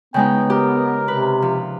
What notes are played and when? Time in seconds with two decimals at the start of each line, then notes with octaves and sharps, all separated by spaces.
0.14 C#3 G#3 B3 D#4 G5
0.50 G4 A#4
1.08 C3 B4
1.42 F3